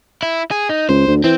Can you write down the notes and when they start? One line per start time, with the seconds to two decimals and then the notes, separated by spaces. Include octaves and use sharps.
0.23 E4
0.51 G#4
0.69 D#4
0.89 C#2 C5
1.08 D2
1.24 E3 C4